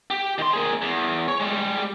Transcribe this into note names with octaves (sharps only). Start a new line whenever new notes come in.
G4
D#3 C6
A#3 G#4
E2
C#5
G3 G#3